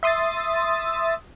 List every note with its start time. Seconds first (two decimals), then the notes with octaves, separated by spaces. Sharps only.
0.03 E5 C6 D#6 E6 A6